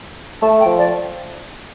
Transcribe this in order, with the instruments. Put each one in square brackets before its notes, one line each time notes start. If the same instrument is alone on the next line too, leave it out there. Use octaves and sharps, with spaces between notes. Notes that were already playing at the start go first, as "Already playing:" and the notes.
[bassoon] A3 [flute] A5
[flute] G5
[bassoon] F3
[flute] D5